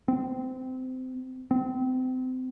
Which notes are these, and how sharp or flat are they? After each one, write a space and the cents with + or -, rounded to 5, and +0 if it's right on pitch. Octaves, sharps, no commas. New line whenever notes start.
C4 -25
C4 -30